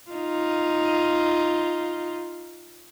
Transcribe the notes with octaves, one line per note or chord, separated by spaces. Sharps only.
D#4 F4